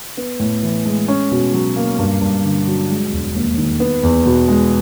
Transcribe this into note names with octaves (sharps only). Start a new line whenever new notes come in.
B3
A2
E3
G#3
C#4
B2
F#3
A#3
G2
G2
D3
F#3
G#3
E1
D#2
D#3
B3
E2
B2
G#3